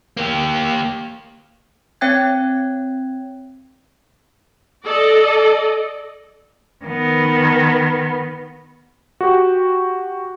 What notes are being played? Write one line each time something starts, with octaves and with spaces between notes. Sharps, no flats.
A#3 G4
C4 C#5 G5 F#6 G#6
A4 D5 D#5
D#3 B3
F#4 G4